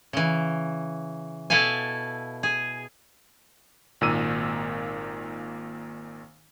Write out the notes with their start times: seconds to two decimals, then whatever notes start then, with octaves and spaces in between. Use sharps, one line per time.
0.13 C#3 E3
1.50 B2 E4 A4 F5 G#5
2.43 G#4
4.01 G#1 A#2 D#3 A#3 E6 D#7